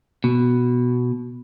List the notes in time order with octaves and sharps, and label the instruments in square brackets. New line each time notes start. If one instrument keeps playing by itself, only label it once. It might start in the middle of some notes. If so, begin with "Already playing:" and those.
[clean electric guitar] B2